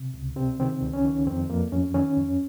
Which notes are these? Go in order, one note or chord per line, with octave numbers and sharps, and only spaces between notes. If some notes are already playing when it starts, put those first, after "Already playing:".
Already playing: C3
C#2
C3 C4
D#3 C4
C#2
C#4
D#3
F2 C4
F2 A#3
F2 C#4
D#3 C#4
F2